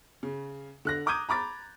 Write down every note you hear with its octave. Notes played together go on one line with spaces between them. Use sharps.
C#3
D3 F#6 A#6
A#5 D6 D#6 G6 G#6 D#7
A#5 B5 D6 A6